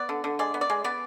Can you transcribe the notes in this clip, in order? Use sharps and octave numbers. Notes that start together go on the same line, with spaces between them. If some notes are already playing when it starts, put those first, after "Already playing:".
Already playing: B3 D5
D3
D3
G#3 D5
B3
D5
G#3
B3 D5